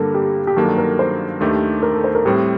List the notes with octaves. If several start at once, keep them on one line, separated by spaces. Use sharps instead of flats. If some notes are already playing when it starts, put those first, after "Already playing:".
Already playing: G2 D3 G3 A#3 A4 A#4
G4
G4
G2 D#3 F#3 A#3 D4 A4
A#4
C5
D#2 D#3 A3 D4 G4
A#4
A4
C5
A#4
A2 G3 C4 G4